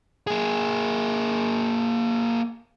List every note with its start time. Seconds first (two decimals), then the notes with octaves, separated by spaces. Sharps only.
0.27 A#3 G#4